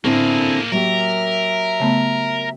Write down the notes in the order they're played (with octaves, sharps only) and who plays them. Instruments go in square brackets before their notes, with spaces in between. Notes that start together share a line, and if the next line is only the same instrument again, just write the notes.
[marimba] A2 [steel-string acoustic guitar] D3 C4 A4 [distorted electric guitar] A#3 G#4 [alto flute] E4
[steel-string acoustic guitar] F#3 A#3 G4 [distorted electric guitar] A#4 [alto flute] E5
[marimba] C#3 A3 B3